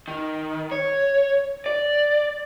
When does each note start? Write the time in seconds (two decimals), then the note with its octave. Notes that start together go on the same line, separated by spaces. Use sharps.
0.08 D#3
0.71 C#5
1.66 D5